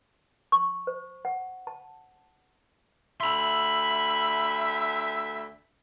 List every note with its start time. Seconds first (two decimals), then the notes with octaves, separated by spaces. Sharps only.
0.52 C#6
0.87 C5
1.25 F#5
1.67 A5
3.21 D2 E5 B5 C6